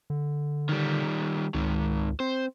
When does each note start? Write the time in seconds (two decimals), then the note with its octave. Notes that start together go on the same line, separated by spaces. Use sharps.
0.10 D3
0.69 D#3 G3
1.54 C#2 G#2 D#3
2.20 C4 C5